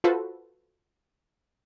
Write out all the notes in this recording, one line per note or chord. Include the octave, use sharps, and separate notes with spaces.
F4 F#4 A4 B4 C5